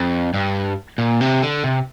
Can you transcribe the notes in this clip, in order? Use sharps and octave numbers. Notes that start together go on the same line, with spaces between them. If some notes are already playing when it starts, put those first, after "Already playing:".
Already playing: F2
G2
A#2
C3
D3
C3